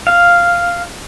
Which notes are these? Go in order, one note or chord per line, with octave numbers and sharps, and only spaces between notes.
F5